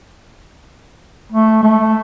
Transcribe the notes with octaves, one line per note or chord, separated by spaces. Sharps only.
A3
A3